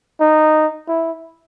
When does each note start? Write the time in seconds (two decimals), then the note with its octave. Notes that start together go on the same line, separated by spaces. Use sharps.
0.21 D#4
0.88 E4